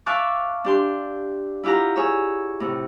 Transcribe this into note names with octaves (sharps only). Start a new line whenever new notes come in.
E5 F5 A5 C#6 D6 F#6
D4 G4 C6
E4 F4 G4 F#5 A#5
G#4 C#5 E6
A2 C3